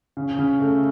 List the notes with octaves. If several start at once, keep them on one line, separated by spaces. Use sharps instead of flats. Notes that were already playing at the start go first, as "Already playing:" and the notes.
C#3
C#3
A3